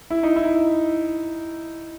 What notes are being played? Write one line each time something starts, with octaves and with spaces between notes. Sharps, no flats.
E4
D#4
E4